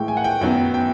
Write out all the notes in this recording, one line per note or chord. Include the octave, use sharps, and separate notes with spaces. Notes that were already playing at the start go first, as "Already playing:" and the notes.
Already playing: A2 E3 G#3 G5
G#5
F#5
G5
F#2 D#3 F#3 B3 G5
G5